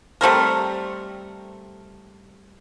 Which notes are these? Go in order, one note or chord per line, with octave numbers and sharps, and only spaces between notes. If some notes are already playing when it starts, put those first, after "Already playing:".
G3 A3 C4 A#4